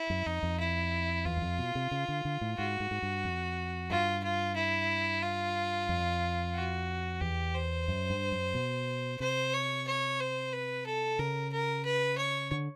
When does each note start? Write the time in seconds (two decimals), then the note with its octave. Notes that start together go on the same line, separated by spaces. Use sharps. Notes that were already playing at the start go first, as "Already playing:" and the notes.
Already playing: E4
0.10 F#2
0.26 F2 D#4
0.43 F2
0.60 E4
1.25 E2 F4
1.37 F#2
1.42 F2
1.59 B2
1.75 C3
1.91 C#3
2.08 D3
2.25 D3
2.41 A2
2.58 G#2 F#4
2.80 G#2
2.91 G#2
3.02 G2
3.24 F2
3.90 G2 F4
4.24 F4
4.56 E4
5.23 F4
5.89 F2
6.55 F#4
7.21 E2 G4
7.54 C5
7.88 F#2
8.10 G2
8.32 F#2
8.54 B2
9.20 C3 C5
9.54 C#5
9.87 C#5
10.20 C5
10.53 B4
10.86 A4
11.19 C#3 A#4
11.53 A#4
11.85 B4
12.18 C#5
12.51 D3